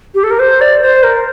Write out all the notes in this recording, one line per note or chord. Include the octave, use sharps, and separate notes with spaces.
G4
A4
A#4
C5
D5
C5
A#4